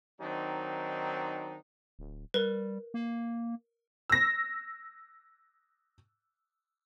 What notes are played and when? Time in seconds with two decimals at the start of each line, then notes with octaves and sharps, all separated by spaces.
0.20 D#3 F#3 C4 D4 D#4
1.99 D1
2.34 G3 A#4 B4
2.94 A#3
4.10 E6 A#6